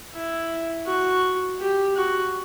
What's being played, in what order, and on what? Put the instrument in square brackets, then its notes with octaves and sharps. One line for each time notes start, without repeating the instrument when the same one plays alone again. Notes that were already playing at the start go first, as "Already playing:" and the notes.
[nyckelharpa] E4
F#4
G4
F#4